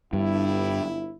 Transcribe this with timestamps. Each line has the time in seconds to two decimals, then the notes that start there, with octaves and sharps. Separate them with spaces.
0.13 G1 G2 E4